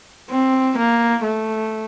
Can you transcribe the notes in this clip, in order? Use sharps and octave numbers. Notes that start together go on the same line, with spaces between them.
C4
A#3
A3